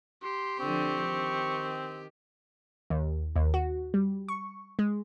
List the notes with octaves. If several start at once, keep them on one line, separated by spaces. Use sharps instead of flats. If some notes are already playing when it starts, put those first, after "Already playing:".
G4 C6
D3 F3 C4 C#6
D#3
D#2
D#2
F#4
G3
C#6
G#3